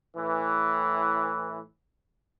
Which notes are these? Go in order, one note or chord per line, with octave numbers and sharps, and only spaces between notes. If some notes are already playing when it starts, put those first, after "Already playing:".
A2 E3